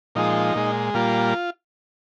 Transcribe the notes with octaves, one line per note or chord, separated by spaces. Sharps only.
A#2 F3 G#3 D#4
A#2 G#3
A#2 G3 A#3 F4